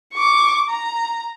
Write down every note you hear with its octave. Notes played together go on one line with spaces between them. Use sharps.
C#6 D6
A#5